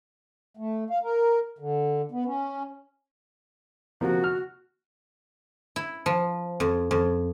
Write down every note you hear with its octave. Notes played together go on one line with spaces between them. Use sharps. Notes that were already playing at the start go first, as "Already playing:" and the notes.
A3
F5
A#4
D3
B3
C#4
C3 F3 A#3 F#4
F6
E4
F3
F2
F2